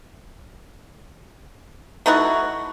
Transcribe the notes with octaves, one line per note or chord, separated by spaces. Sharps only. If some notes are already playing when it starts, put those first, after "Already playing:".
A3 D#4 E4 F#4